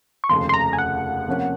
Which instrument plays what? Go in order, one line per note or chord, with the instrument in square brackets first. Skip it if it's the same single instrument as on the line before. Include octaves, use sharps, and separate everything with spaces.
[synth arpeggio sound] C#6
[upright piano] F1 D#2 C#3 F3 [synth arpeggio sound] C6
[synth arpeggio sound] C6
A#5
G#5
F#5
[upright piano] C3 F3 A#3 C#4